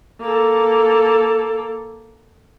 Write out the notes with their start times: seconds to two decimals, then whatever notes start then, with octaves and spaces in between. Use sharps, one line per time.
0.21 A#3 A4